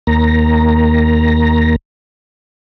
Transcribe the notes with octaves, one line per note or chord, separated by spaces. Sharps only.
D#2 A#3 A#5